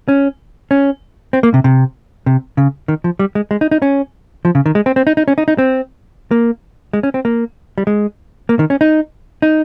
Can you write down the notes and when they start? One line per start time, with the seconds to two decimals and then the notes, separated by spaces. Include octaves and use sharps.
0.08 C#4
0.71 C#4
1.33 C4
1.43 A#3
1.54 C3
1.64 C3
2.26 C3
2.57 C#3
2.88 D#3
3.04 F3
3.19 G3
3.35 G#3
3.51 G#3
3.61 D#4
3.71 D#4
3.82 C#4
4.45 F3
4.55 C#3
4.66 D#3
4.75 G#3
4.86 C4
4.96 C4
5.07 D#4
5.17 D#4
5.28 C#4
5.38 D#4
5.48 D#4
5.58 C4
6.31 A#3
6.93 G#3
7.03 C#4
7.14 C4
7.25 A#3
7.78 G3
7.87 G#3
8.49 A#3
8.59 D#3
8.70 C#4
8.81 D#4
9.42 D#4